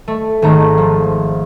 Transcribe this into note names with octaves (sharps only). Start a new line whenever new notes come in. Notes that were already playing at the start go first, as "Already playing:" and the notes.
A3
G#1 A3 A#5
F3